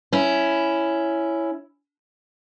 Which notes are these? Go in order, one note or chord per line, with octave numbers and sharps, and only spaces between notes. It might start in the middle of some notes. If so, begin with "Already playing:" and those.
C#4 E4